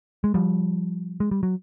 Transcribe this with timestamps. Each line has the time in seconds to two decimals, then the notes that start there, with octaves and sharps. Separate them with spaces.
0.24 G#3
0.34 F3 G3
1.20 G#3
1.31 G3
1.43 F#3